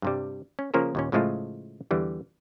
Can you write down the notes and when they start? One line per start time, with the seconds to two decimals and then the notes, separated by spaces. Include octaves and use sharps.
0.02 G2 C3 G3
0.59 C#4
0.74 C#3 F3 A#3 C#4 A#4 C5
0.95 D#2 A#2 C#4
1.12 A2 C#3 F3 G#3 A3 F4
1.91 E2 D3 E3 G3